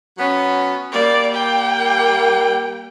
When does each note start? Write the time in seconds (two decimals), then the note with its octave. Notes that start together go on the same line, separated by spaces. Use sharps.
0.18 F#3 B3 C#4
0.93 G3 A#3 D5
1.34 G5